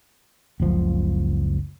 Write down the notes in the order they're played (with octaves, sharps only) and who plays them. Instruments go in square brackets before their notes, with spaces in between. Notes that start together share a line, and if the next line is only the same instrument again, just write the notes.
[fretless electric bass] F#1 C#2 F3